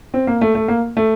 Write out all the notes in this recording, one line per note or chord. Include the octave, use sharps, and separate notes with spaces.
C4
A#3
A3
A3
A#3
A3